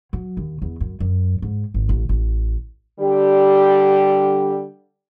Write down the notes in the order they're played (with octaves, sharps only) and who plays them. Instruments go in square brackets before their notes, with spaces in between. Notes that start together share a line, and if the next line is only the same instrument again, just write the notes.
[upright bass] F#3
D#2
E2
F#2
F#2
G#2
G#1
A1
A1
[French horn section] D3 G3 G4